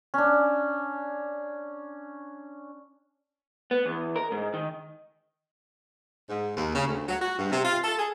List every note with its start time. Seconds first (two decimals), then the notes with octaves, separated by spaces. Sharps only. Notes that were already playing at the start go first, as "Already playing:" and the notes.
0.14 C#4 D4
3.71 B3
3.86 E2
4.16 A#4
4.32 G#2
4.54 D#3
6.29 G#2
6.56 D#2
6.75 C#3
6.87 D2
7.09 F#3
7.21 F#4
7.39 G2
7.52 C3
7.65 F4
7.84 A4
7.98 G#4